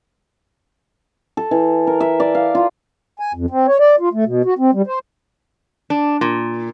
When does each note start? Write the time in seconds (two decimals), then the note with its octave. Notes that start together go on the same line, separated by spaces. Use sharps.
1.37 A4
1.51 E3
1.87 A#4
2.00 E5
2.20 D5
2.35 F5
2.55 F4
3.19 G#5
3.34 F2
3.50 C4
3.67 C#5
3.80 D5
4.00 F4
4.13 A3
4.26 B2
4.45 F#4
4.59 C4
4.74 G3
4.87 C5
5.90 D4
6.21 A#2